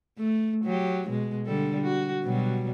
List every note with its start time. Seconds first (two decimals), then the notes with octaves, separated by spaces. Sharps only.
0.18 A3
0.65 F#3 G4
1.09 B2 G#3
1.46 D3 G3 A4
1.83 F#4
2.23 B2 F#3 G3